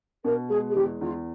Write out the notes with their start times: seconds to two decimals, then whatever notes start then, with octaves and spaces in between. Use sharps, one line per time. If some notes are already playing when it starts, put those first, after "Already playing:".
0.25 B2 A#4
0.49 G#3 G#4
0.71 G#4
0.75 E2 G4
1.01 E2 F4